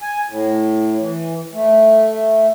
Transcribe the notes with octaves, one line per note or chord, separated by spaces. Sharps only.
G#5
A2
E3
A3